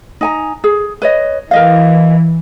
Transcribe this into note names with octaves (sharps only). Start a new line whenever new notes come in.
D#4 G#5 A#5
G#4
B4 C#5 D#5
E3 A#4 D#5 F5